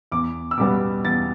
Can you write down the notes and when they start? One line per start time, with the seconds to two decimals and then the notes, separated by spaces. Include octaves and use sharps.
0.12 E2 D6
0.51 E6
0.58 B2 G3 B3 D6
1.05 E2 A6